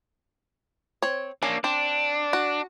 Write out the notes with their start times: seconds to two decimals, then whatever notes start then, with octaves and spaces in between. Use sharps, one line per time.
1.02 C4 C#5
1.43 A#3 C#4 D4
1.64 C4 D4
2.33 F#4